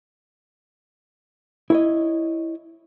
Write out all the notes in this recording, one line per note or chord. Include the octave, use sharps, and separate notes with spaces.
E4 C#5 D#5